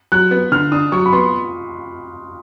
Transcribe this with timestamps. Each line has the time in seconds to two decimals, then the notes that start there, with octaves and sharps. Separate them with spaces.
0.12 F#3 F#6
0.31 B3
0.52 D3 F6
0.72 D4 D#6
0.92 F#3 C#6
1.06 B5
1.13 B3 C6